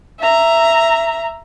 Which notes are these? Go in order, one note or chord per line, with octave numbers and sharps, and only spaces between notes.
E5 A#5